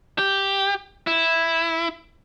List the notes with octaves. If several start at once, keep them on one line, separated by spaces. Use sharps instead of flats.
G4
E4